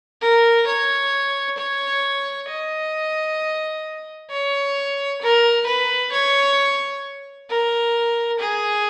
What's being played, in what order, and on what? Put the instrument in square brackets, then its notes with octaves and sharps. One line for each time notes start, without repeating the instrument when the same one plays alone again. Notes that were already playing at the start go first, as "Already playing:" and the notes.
[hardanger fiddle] A#4
C#5
C#5
D#5
C#5
A#4
B4
C#5
A#4
G#4